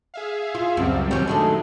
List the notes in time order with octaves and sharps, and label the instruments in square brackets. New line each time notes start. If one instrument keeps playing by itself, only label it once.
[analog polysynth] G#4 E5 F5
[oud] F4
[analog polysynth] C#2 G3 C4 [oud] F#2
[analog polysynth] D#3 F#3 [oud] G3 C#4
[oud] G#3 A3 D4